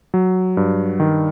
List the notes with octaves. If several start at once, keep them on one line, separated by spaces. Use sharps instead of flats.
F#3
G2
D#3